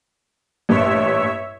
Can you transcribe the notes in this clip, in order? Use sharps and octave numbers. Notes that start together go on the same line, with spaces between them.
A1 G2 A#2 C#5 E5